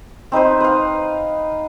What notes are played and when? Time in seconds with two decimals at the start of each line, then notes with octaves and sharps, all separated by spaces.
0.32 C4 D#4 B4 C5
0.60 B4 F5